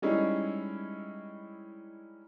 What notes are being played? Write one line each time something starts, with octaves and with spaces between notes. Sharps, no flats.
G3 G#3 C#4 D#4 E4 G#4